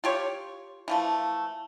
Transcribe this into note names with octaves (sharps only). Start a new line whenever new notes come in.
F4 G4 C#5
E3 F3 A3